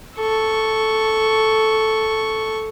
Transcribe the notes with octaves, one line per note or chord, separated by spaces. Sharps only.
A4 C#6